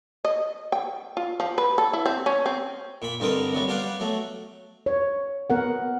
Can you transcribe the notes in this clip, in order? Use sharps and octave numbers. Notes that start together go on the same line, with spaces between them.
D#5
G5
F4
F3
B4
A4
E4
C4
C#4
C4
A#2 B5
G2 D3 G3 C4 A#4 D#5
C3 F#3 G3
G3 B3 G4 D5 F5 F#5
F#3 A3
C#5
B3 A#4 F#5